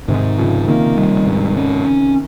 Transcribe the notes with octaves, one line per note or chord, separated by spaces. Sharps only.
G#2 C3 D#3
C#3 F3 C#4
C3 D#3 A#3
G3
G#2
C#4